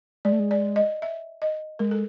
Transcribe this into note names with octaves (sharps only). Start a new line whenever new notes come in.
G#3 D5
A3
G#3
D5
D#5
E5
D#5
G#3 A#4
A4